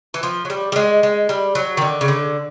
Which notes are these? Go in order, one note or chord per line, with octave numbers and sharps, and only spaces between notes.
E3
F3
F#3
G3
G3
G#3
G#3
G3
F#3
D#3
D3
C#3
D3